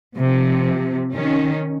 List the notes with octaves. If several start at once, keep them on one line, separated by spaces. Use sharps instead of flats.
C3 F3
D#3 C#4